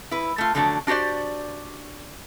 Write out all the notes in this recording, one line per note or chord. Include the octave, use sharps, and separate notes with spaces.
E4 B4
A3 F4
D3 F3 F#3 A3 D4
D4 F#4 G4 C5 D5